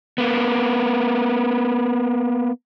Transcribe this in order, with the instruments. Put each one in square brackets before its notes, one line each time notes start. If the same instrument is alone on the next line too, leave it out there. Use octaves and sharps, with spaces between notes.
[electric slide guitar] A#3 B3